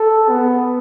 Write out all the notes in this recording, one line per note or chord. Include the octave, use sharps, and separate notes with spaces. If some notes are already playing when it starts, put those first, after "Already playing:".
Already playing: A4
B3